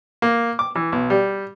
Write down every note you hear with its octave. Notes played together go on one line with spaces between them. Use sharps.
A#3
D6
E3
B1
G3